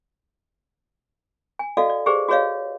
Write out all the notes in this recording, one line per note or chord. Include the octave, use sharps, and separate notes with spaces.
G#5
F#4 A4 D5 D#5 F5
D5
G4 G#4 B4 C5 D5
F#4 G#4 B4 C#5 D#5 F5